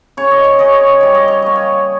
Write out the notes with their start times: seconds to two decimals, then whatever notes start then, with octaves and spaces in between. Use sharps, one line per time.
0.17 C#3 C#5
0.31 D#5
0.44 C#5
0.59 C#3 D#5
0.73 C#5
0.87 D#5
1.01 G3 C#5
1.15 D#5
1.28 C#5
1.42 A#3 D#5
1.56 C#5